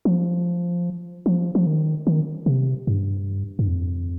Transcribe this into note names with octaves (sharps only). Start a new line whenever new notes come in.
F3
F3
F3
D#3
D#3
C3
G2
G2
F2